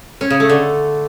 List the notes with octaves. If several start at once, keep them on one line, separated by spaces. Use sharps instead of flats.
C#4
C#3
A3
D3